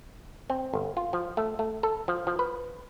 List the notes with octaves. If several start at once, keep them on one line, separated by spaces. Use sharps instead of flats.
C4
G1
F4
F3
A3
A3
A4
F3
F3
B4